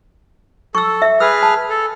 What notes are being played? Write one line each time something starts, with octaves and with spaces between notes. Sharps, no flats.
A4 C#6 E6
E5
G#4 B4 E6 F6
A5
A4